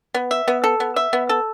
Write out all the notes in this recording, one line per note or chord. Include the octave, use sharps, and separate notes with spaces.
B3
E5
B3
A4
B3
E5
B3
A4